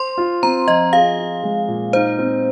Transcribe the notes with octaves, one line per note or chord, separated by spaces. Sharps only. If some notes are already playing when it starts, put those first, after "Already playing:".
Already playing: C5 C6
F4
C4 A#5
F3 D#5
G#4 F5
F4
G#3
A#2
D#4 C5
C4